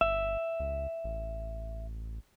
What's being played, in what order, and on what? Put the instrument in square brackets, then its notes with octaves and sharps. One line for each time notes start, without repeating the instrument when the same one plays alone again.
[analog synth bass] G1 [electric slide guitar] E5
[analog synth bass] C#2
A1